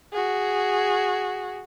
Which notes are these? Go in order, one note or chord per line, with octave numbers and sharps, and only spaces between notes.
F#4 G#4